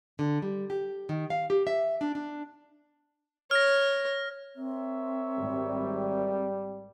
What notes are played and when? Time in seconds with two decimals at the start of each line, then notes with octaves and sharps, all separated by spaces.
0.19 D3
0.42 G3
0.70 G4
1.09 D#3
1.30 F5
1.50 G4
1.67 E5
2.01 D4
2.15 D4
3.51 C#5 F6 A#6
4.56 C4 A#4 C#5 E5
5.37 G#1 G3